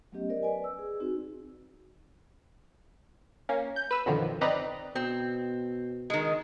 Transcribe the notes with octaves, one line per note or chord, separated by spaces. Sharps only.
F#3 A3 B3 C#4 G4 D#5
A#4 C5 D5 D#5
B4 D5 G#5
E6
G#4
C4 D#4 F#4
A#3 C#4
G6
B4 E6
F#2 B2 D3 D#3 F3
C4 D#4 B4 D5 D#5 A#5
B2 C4
D#3 G#3